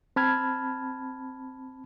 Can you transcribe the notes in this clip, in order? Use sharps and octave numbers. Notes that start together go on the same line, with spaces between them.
C4 A5 B5 F6 G#6